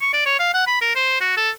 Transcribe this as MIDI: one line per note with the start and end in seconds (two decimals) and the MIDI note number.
0.01 0.13 85
0.13 0.24 74
0.26 0.37 73
0.39 0.50 77
0.54 0.65 78
0.67 0.79 83
0.81 0.96 70
0.96 1.18 72
1.21 1.36 66
1.37 1.50 69